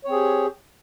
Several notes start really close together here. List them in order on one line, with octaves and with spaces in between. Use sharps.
C#5 C4 G#4 G4